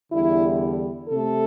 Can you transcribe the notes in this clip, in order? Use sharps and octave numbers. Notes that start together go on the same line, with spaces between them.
E2 D3 G3 E4
C3 A3 A4